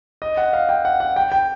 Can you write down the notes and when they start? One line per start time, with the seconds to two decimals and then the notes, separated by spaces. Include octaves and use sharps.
0.22 D#5
0.37 F#5
0.53 F5
0.69 G5
0.85 F#5
1.00 F#5
1.16 G5
1.32 G5